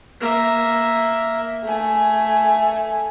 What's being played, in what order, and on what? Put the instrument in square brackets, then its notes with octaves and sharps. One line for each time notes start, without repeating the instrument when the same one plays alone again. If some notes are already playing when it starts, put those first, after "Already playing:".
[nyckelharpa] A#3 E5
[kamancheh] A3 G#5